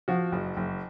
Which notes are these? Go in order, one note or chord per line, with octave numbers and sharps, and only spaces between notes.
F3 F#4
F#1
F#1